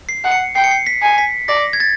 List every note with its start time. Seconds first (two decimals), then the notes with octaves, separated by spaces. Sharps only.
0.09 C7
0.24 F#5
0.32 C#7
0.55 G5 C7
0.64 C#7
0.71 C7
0.87 B6
1.02 G#5
1.18 B6
1.48 D5 A#6
1.73 G#6
1.80 A6